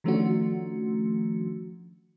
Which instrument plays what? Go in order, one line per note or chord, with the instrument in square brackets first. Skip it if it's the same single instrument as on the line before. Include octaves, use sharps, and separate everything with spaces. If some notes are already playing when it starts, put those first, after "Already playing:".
[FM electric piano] D#3 F3 A3 C#4 D4 F#4